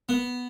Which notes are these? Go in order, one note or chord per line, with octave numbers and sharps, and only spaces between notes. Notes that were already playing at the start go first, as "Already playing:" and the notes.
B3